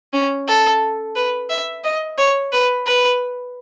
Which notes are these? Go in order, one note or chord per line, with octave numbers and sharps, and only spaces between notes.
C#4
A4
B4
E5
D#5
C#5
B4
B4